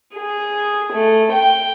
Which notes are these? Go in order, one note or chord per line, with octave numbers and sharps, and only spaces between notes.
G#4
A3
G5